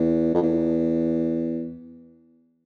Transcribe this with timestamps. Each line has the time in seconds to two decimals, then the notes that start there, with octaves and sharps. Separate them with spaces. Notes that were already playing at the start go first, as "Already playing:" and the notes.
Already playing: E2
0.34 F2
0.42 E2